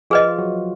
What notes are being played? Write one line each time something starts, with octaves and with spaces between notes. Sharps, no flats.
F3 F4 G#4 B4 D#5
F4
F#3 F#4